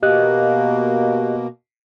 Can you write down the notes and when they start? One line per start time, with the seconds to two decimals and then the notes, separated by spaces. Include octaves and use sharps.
0.03 B2 A#3 G4 D#5 F#6